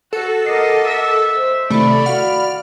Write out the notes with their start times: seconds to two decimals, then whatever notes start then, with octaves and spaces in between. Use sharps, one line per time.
0.13 F#4 A4
0.46 A#4 D#5 F#5 D6 C7
0.87 E5
1.35 C5
1.70 C3 D#3 A3 E4 D5 B5
2.06 F#4 F5 F#5 F6